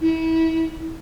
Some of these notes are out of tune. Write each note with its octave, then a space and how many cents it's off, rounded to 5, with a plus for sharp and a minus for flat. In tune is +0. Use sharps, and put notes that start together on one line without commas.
E4 -30